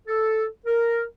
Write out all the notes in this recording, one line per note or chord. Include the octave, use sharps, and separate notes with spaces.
A4
A#4